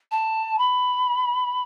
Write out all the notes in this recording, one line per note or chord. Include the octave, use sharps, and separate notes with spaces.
A5
B5